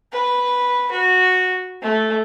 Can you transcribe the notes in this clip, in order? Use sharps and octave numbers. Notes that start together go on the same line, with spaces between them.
B4
F#4
A3